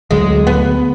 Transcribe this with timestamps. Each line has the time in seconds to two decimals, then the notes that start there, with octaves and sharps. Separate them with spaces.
0.11 D2 D3 F#3 G#3
0.47 B3